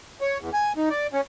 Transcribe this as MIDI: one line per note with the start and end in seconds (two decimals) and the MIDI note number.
0.21 0.38 73
0.40 0.50 40
0.53 0.73 80
0.77 0.89 63
0.90 1.07 74
1.13 1.21 61